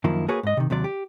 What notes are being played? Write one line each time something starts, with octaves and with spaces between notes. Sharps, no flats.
F#2 D#3 F3 A#3 E4
A#3 F#4 G#4 B4 C#5
G#2 D#5
C3 D#3
D#2 C3 F#3 D5
G4